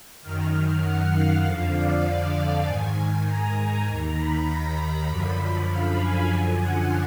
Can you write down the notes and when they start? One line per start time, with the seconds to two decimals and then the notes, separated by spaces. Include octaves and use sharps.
0.22 F#2 D#3 F6
0.83 F#5
1.13 F5
1.44 F2 D3 F3
1.75 D5
2.35 D5
2.65 G#2 D#3 G#5
3.26 A#5
3.57 G#5
3.87 D#2 D#3 A#5
4.17 B5
4.48 A#5
5.08 F#2 D3 F3 B5
5.69 F5
6.00 G#5
6.30 F#2 D3 F3
6.60 F#5